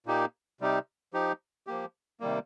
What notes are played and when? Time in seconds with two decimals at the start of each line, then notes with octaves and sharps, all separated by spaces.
0.06 A#2 A#3 D#4 G4
0.61 C3 G3 D#4 G4
1.13 F3 D#4 G4
1.67 F3 A#3 G4
2.20 C3 D#3 G3 A#3